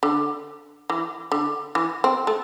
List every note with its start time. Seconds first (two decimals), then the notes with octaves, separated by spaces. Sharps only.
0.03 D3
0.90 E3
1.32 D3
1.75 E3
2.04 C4
2.27 A3